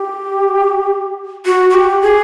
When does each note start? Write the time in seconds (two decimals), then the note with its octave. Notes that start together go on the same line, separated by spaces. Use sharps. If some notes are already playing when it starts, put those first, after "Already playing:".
Already playing: G4
1.46 F#4
1.70 F#4
1.74 G4
2.02 G#4